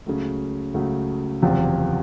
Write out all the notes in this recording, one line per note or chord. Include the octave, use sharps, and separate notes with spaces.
C#2 C#3 F#3 A3
C#2 C#3 F#3 A3
F#1 E2 C3 F3